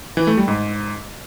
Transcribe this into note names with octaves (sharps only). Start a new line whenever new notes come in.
E3
A3
G3
G#2